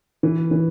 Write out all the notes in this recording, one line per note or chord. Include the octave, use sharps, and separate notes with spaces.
E3
E3